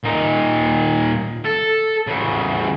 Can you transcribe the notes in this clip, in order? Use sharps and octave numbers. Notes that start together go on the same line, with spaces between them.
A#2 D#4
A4
E2 C#3